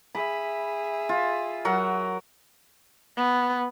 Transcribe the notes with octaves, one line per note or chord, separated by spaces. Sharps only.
G#4 E5 B5
F4
F#3 A#4 F#5
B3